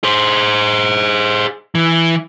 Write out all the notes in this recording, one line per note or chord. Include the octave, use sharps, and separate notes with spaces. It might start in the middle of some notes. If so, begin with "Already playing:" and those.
G#4 C5
E3